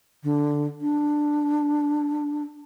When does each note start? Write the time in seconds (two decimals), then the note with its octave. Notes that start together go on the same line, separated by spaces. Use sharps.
0.23 D3
0.81 D4